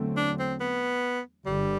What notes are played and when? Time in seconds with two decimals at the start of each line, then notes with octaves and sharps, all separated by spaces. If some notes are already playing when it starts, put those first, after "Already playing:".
Already playing: E2 D3 F#3 A3 C4
0.17 D4
0.39 C4
0.60 B3
1.45 G1 G2 D3 G3